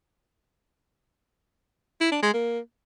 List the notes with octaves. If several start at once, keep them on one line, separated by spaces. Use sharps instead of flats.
E4
D4
G#3
A#3